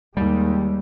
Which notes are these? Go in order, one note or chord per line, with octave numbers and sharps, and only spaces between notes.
D#2 G3 G#3